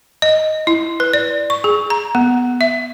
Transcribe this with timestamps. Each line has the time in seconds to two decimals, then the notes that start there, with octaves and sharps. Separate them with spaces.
0.22 D#5
0.67 E4
1.00 B4
1.13 D5
1.50 C#6
1.64 G#4
1.90 A#5
2.15 B3
2.61 E5